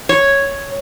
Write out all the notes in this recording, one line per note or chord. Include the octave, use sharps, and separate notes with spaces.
C#5